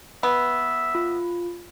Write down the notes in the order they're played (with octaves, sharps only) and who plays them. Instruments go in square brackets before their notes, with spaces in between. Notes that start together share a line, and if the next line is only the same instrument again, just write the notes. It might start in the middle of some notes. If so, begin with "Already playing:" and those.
[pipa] B3 [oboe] E5
[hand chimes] F4